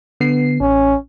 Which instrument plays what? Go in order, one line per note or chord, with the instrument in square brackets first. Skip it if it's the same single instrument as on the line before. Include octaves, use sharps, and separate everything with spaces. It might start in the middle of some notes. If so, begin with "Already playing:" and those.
[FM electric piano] D3 B3 C7
[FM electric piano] A1 [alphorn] C#4